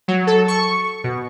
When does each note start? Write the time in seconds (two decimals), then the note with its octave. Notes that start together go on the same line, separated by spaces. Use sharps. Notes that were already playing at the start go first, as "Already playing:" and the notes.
0.08 F#3
0.27 A4
0.48 C#6
1.04 B2